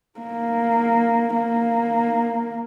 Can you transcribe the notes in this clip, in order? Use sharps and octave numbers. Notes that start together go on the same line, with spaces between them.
A#3
A#3